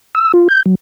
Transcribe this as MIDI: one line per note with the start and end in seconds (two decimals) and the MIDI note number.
0.15 0.32 88
0.34 0.48 65
0.49 0.63 91
0.66 0.75 54